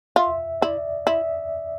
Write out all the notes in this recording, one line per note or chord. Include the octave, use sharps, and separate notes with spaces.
F4 E5
E4 D5
E4 E5